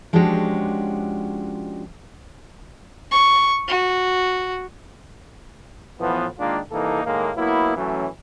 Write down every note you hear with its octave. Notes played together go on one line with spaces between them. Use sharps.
F3 G#3 C#4 D4 F#4 G4
C#6
F#4
A2 E3 F3 B3
D#3 G#3 A#3 D4 F4
C2 E3 A#3 D#4 A4
A2 D#3 G#3 A#3
F#3 A#3 B3 E4
E3 F#3 A3 C#4